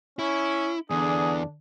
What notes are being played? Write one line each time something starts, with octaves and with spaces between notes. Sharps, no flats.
C#4 E4
E2 D3 D4 G#4